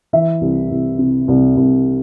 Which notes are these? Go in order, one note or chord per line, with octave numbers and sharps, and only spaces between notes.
E3 E5
C2
C2
C3
C2
C2